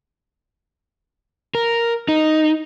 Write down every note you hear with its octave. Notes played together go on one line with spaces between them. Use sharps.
A#4
D#4